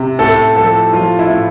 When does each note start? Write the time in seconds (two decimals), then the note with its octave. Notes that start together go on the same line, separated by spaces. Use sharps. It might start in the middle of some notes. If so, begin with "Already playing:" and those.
Already playing: C3
0.19 A2 A4
0.56 F3 A4
0.93 F3 F4
1.19 E4
1.30 A2